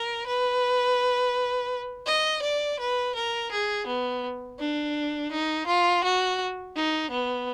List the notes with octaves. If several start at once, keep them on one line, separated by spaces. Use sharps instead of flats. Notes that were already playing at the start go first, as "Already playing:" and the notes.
Already playing: A#4
B4
D#5
D5
B4
A#4
G#4
B3
D4
D#4
F4
F#4
D#4
B3